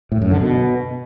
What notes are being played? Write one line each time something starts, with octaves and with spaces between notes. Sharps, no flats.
A2
F#2
D3
B2